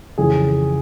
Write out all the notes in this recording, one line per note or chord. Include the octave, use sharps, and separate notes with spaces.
F2 C#3 E3 G#4